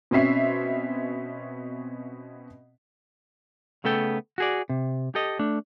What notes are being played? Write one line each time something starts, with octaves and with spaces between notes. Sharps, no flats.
B2 C4 C#4 E5 C7
C#3 A3 B3 A4 G5
F#4 G#4 D5
C3
G4 A4 D#5
A3 D4